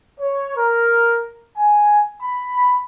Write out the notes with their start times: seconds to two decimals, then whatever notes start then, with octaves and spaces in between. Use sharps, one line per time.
0.20 C#5
0.57 A#4
1.57 G#5
2.21 B5